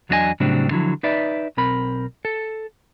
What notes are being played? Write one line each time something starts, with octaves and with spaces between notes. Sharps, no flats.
E2 F#3 D4 D#4 D#5 G#5
A2 C#3 F#3 G3 C4 D4
D3 F3 F#3 E4
D#4 B4 D5 E5
B1 C4 A#4 B5
A4